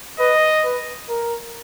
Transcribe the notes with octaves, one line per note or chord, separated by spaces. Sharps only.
B4 D#5
B4
A#4